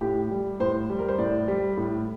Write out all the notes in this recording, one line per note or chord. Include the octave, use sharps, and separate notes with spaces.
A2 G4
G3
A2 C5
G3
A#4
C5
A2 D5
G3
A2